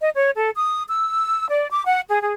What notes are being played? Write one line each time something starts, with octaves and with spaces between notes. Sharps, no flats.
D#5
C#5
A4
D#6
E6
D5
D6
F#5
G#4
G#4